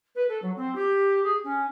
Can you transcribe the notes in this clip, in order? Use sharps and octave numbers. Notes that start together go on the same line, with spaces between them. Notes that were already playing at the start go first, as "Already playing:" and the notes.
B4
A4
F#3
C4
G4
G#4
C#4